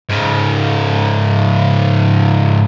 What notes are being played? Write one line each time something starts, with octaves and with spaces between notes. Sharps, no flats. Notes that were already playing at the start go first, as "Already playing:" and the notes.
G#2 C#3